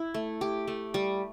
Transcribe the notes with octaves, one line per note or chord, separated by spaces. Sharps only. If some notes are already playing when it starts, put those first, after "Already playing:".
Already playing: E4
A3
G4
A3
G3